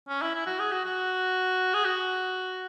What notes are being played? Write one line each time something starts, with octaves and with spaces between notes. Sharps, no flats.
C#4
E4
E4
F#4
G#4
F#4
F#4
G#4
F#4